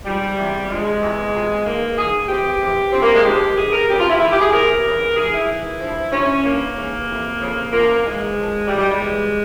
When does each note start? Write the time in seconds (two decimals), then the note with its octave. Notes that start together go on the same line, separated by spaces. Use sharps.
0.05 G#2 F3 G3
0.37 E2 C3 E3
0.69 G2 F3 G#3
1.01 E2 C3 E3
1.33 E2 C3 F3
1.65 G#2 E3 A#3
1.96 G#2 E3 G#4
2.28 F2 C3 E3 G4
2.60 E2 C3 E3
2.92 G2 F3 C4
3.02 A#3
3.14 G#3
3.24 G2 F3 G4
3.56 G2 E3 G#4
3.72 A#4
3.89 F2 C#3 E3 G4
3.99 F4
4.09 E4
4.20 G#2 E3 E4
4.31 G4
4.41 G#4
4.52 E2 C3 E3 A#4
4.84 E2 C#3 E3
5.16 G#2 E3 G#4
5.32 E4
5.48 G#2 E3
5.80 G2 F3
6.12 G2 F3 C#4
6.43 G2 E3 A#3
6.75 G#2 E3
7.08 F2 C3 E3
7.40 F2 C#3 F3
7.72 E2 C#3 F3 A#3
8.03 G#2 E3 G#3
8.36 G#2 F3
8.67 G#2 E3 G3
8.78 G3
8.89 G#3
8.99 E2 E3